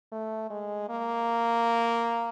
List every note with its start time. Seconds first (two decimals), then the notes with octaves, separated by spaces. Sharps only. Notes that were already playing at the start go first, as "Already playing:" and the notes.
0.12 A3
0.51 G#3
0.89 A#3